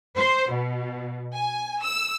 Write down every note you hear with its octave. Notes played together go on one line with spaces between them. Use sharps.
C5
B2
G#5
E6